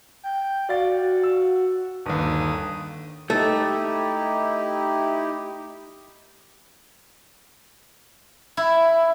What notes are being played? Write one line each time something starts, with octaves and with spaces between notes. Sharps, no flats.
G5
F#4 D5 F5 A6
F#4
E6
G1 D#2 D#6
A3 D#4 E4 G4
E4